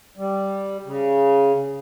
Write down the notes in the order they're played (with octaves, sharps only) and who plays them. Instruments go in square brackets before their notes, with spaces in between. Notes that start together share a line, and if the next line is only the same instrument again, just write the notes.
[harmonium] G3
C#3